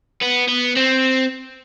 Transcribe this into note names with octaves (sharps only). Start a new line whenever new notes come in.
B3
B3
C4